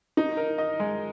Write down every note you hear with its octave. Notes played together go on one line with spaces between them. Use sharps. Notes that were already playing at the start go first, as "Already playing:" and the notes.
D#4
A#4
D#5
G#3